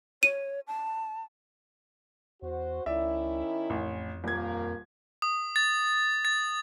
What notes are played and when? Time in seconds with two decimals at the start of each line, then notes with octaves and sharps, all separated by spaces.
0.23 C#5 D#7
0.67 A5
2.42 E2 F#4 C5
2.86 C#2 D#3 C#4 E4 D5 E5
3.70 A1 F2
4.24 D#1 A#3 G#6
5.22 D#6
5.56 A6
6.25 A6